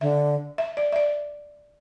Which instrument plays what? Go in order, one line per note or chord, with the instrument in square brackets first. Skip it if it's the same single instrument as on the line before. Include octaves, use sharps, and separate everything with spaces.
[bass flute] D3 [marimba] E5
[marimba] E5
D5
E5
D5